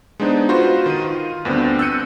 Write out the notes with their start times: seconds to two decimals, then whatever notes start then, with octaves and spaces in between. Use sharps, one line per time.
0.20 G#3 B3 D4 D#4 C5
0.49 F4 F#4 B4 C5
0.86 D#3 D#7
1.02 F4
1.45 D2 G2 B3 C4 D4
1.79 E6 F#6 G6 C#7 D#7